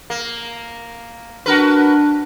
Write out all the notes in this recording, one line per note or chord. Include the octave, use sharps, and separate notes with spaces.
A#3
D4 F#4 A#4 B4